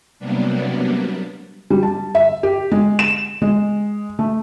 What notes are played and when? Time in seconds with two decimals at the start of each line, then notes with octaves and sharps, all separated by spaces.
0.19 C3 F#3 G3 A#3 B3 D4
1.70 G3
1.83 A5
2.15 E5
2.43 G4
2.72 G#3
2.99 E7
3.42 G#3
4.19 A3